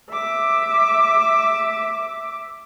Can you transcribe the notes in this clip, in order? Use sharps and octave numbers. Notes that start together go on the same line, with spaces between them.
E5 D6